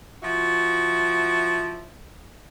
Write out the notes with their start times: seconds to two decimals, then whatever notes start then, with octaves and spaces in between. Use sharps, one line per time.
0.22 F3 E4 F#4